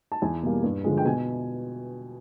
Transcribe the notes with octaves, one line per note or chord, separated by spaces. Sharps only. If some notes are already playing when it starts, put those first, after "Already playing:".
A5
E2 G#5
B2 G3 A#3
G2
D3 F3 G#3
G5
B2 G#5